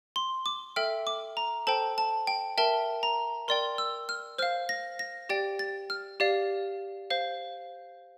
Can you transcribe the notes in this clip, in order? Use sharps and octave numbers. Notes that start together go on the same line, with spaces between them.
C6
D6
A4 E5 G5 F6
D6
A#5
A4 C5 G5 A5
A5
G5
A#4 E5 G5 A5
A#5
A#4 D5 G5 C6
E6
F6
C5 F5 F6
A#6
A#6
G4 D5 G5 A6
A6
F6
G4 D5 F5
C5 F5